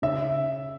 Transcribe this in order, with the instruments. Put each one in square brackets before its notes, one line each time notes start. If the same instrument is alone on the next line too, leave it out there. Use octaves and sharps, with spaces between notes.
[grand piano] C#3 E5